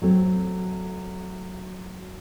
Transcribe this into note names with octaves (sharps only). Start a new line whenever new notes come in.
F#3 A3 C4